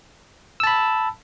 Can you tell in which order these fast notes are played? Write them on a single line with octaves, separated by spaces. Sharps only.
E6 A5 B5